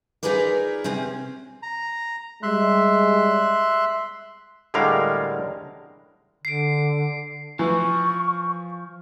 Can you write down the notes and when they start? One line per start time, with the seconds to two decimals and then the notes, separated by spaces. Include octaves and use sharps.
0.23 D#4 F4 G#4 A#4 B4 D5
0.84 C3 C4 C#4
1.63 A#5
2.43 G3 G#3 E5 C6 F#6
4.74 A2 D3 G3 G#3 A#4 F5
6.45 D3 C7 D7
7.59 E3 F3 C#6